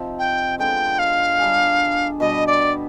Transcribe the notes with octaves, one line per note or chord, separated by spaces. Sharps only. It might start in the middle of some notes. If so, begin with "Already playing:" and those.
Already playing: C3 F3 C4 D#4
G5
D3 G#3 B3 F4 G5
F5
G3 D4 G#4
B2 G3 B3 D#5
D5